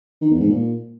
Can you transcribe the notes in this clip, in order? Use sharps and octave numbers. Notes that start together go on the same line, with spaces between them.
D#3
E2
G#2
A#2